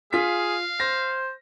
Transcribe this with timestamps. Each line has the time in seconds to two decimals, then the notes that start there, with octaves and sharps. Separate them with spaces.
0.13 F4 G#4 F5 B6
0.80 C5 A#6